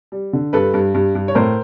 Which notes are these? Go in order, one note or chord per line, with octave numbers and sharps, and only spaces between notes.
G3
D3
G2 A4 B4
G2
G2
G2
C#5
A2 A#4 C5